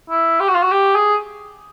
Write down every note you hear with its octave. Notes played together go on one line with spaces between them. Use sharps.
E4
G4
F#4
F4
F#4
G4
G#4